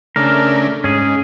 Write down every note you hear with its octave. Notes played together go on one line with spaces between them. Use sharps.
C#3 A3 D4 A#4
G#2 C#4 G#4